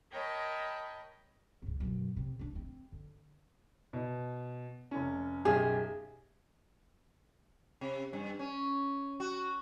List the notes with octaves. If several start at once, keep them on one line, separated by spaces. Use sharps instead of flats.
A#4 C#5 D#5 G5 A5 B5
C#2 G#2
F#2 B2
C3
A3 D4
C4
D3
B2
F1 C#4
B1 F#2 G4 G#4
C3
G2
C#4
F#4